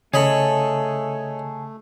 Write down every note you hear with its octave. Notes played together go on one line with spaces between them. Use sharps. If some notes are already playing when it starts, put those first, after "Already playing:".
C#3 A3 G#4 A4 C#5 D#5 B5